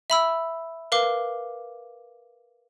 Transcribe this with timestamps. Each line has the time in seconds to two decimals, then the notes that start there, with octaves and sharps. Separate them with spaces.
0.10 E5 B5 E6
0.92 A#4 B4 F5 D6